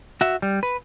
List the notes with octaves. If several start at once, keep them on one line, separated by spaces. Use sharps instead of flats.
F#4 E5
G3
B4